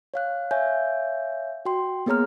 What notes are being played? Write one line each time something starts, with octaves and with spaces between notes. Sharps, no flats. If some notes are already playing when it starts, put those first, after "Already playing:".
C#5 F5 F#6
C#5 E5 F5 G#5 G6
F#4 G5 C6
A#3 B3 G#4 C#5 A#5 F6